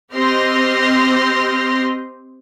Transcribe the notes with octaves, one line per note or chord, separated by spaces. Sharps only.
C4 G4 D#5 C6 F6 A#6